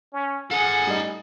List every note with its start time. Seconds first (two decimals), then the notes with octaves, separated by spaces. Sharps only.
0.13 C#4
0.51 G#4 A4 F#5 G#5
0.87 G3 A3 D#4